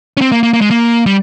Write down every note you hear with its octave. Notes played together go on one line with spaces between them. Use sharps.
C#4
C4
A#3
A#3
A#3
G#3
A#3
G3